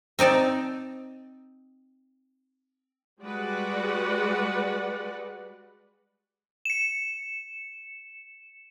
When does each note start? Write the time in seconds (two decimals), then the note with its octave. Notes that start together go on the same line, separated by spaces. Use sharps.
0.19 C4 D#4 D5 A5
3.22 G3 G#3 F#4 B4 D5 F#5
6.65 C#7 E7